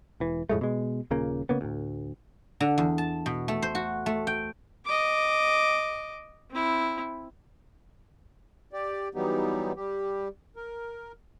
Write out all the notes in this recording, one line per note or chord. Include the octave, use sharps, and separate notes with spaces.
E1 E3
F2 A2 G#3 A3
B2 G#3
D#1 A#2 C#3 A#3
C#3 A#3 B3
D2 A2
D3
E2
A5
B2
A3
C5
F#4
A3
G5
D#5 D6
C4 E4
G4 D5
E3 F#3 G3 B3 D#4 G4
G3 G4
A#4